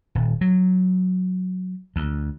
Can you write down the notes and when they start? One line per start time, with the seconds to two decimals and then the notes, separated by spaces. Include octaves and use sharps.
0.15 D#1
0.41 F#3
1.96 D2